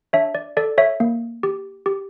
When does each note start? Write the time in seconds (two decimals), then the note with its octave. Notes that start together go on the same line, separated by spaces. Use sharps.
0.13 D4 C#5 E5
0.35 D5
0.57 A4 D5
0.78 C#5 E5
1.00 A#3
1.43 G4
1.86 G4